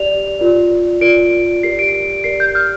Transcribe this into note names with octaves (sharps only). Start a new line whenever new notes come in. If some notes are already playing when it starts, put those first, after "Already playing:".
Already playing: G4 D5 F7
F4 A#4 D5
F4 A#4 D5 D7
G4 A#4 D5 C7
D7
D7
D7
G4 A#4 D5 C7
G6
F6